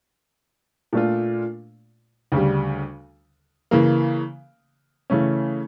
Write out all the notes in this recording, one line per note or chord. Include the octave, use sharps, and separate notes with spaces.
A#2 A3 D4 F4
D2 C#3 G3
C#3 E3 A#3
C#3 E3 A3 C#4